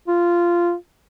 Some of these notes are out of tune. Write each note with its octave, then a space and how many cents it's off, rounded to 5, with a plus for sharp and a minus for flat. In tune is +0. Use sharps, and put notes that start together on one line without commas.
F4 -10